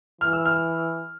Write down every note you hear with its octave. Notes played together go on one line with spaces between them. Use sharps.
E3 F6
E6
F6